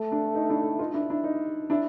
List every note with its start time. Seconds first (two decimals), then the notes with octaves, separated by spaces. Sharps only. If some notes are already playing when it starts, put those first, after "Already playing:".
Already playing: A3
0.12 D4
0.35 D#4
0.49 D4 E4
0.79 D#4 F4
0.94 D4 E4
1.10 D4 E4
1.24 D#4
1.70 D4 E4